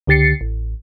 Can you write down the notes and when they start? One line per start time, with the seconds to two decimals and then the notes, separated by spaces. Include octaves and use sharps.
0.07 C#2 D3 G4 A6 C7 C#7
0.41 A1